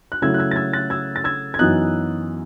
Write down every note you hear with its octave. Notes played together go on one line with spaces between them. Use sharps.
F#6
C#3 F#3 A3 E4 E6 G#6
F#6
E6 G#6
A6
E6 G#6
F#6 A6
E6 G#6
A6
E6 G#6
G#6
F#2 E3 B3 D#4 D#6 F#6